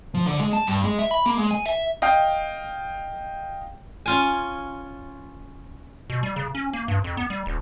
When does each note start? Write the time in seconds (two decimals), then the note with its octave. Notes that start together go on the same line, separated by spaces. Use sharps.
0.14 F3
0.27 D3
0.40 G#3
0.53 A5
0.67 G2
0.84 G#3
0.99 E5
1.11 B5
1.26 A#3
1.38 G#3
1.51 G#5
1.66 E5
2.02 D#5 F5 G5
4.06 C#4 F4 G#5
6.10 B2
6.23 G3
6.36 C#3
6.55 C#4
6.73 A#3
6.88 G2
7.04 F2
7.17 B3
7.30 G3
7.46 D#1